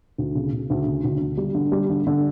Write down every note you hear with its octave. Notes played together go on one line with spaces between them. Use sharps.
D2
C#3
C#3
D2
C#3
D2
D3
G3
D3
G3
D3
D3